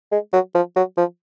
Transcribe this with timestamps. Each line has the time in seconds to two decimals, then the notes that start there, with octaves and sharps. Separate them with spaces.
0.12 G#3
0.33 F#3
0.55 F3
0.76 F#3
0.97 F3